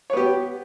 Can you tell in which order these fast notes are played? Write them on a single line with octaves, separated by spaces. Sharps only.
C#5 B3 G4